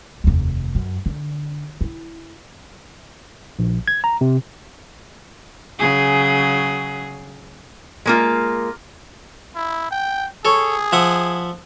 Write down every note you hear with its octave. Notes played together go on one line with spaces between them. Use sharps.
F1 D#2
F#2
D3
E4
A#1
G#6
A#5
C3
C#3 F#3 G#4
G#3 A#3 F4
E4
G5
G#4 A4 C#5
F3 E5 F#5